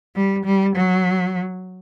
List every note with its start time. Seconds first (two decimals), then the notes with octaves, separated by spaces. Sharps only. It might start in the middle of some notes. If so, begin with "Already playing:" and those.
0.16 G3
0.45 G3
0.76 F#3